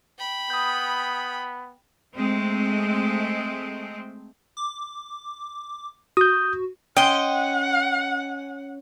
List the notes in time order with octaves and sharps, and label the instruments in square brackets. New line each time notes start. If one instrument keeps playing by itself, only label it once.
[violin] G5 B5
[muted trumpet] B3 [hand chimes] D#6 G6
[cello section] G#3 A3 C4
[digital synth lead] D6
[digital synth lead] F#4 [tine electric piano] D#6 G6
[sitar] C#4 [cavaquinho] D#5 C6 [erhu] F#5 [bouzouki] G5